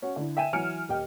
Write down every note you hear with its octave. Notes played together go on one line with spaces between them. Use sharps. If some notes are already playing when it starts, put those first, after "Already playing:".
C#4 F#4
D3 E4
E5 G5 G#5 D#7 E7
E3 F#3 G#5 F6 C#7 D7
D#1 G4 D#5 G5